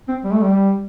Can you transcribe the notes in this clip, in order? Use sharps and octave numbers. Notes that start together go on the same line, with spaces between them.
C4
G3
A3
G3